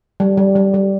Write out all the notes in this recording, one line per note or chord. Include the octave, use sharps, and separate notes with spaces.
G3
G3
G3
G3